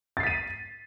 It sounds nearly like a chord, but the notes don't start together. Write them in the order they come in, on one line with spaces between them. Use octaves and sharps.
A6 C7 B6 D#7